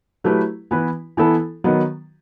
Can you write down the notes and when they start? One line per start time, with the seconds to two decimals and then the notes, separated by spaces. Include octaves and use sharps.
0.24 F#3 A3 E4 G4 B4
0.71 E3 B3 E4 B4
1.17 E3 B3 E4 A4
1.64 D#3 F#3 B3